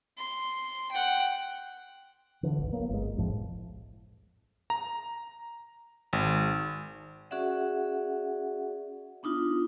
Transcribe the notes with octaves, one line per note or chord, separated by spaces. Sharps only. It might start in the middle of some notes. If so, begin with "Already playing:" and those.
C6
F#5 G5
D3 E3
G#1 C#2
F#3 A#3 B3
G1 G#3
B1 F2 A2 F3
A#5
G#1
C#4 F#4 G#4 D5 E5 F#5
B3 D4 D#4 F4